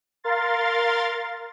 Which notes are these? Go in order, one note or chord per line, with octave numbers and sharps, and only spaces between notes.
A#4 F5 C6 A6